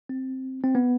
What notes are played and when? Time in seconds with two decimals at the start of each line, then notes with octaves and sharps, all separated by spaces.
0.09 C4
0.64 C4
0.75 B3